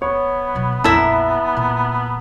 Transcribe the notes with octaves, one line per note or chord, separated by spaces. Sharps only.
B3 C#5
B2 F#3
A#1 F2 E4 E5 A5 A#5 E6
A#2